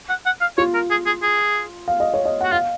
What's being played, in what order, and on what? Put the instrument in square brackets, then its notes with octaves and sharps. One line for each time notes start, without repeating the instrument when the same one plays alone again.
[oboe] F#5
F#5
F5
[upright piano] F4 [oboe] C#5
[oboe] A#4
G#4
G#4
G#4
[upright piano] F5
D#5
C#5
D#5
[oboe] F#4 [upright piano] F#5
[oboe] F4 [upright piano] F5